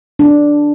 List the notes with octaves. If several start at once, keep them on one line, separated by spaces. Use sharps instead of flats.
D4